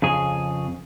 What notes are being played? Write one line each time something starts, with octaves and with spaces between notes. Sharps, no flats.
F2 C#3 G#4